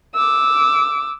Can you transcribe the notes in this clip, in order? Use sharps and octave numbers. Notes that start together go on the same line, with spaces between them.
D6 E6